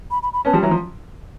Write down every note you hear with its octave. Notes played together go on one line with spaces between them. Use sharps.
B5
B5
B5
B3 C#4 A5
F3 G3
E3 F#3 A#5
F3